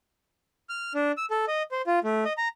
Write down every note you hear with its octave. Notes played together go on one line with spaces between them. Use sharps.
F6
D4
E6
A4
D#5
C5
F4
A3
D#5
A#5